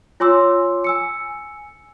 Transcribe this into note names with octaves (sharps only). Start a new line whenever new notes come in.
F4 C#5 G#5 C6 D6 E6
G#5 E6 C#7